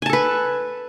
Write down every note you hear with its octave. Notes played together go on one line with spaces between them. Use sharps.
A4 B4 G#5 A5